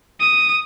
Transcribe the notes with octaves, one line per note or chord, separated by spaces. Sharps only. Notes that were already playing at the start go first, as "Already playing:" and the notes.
D#6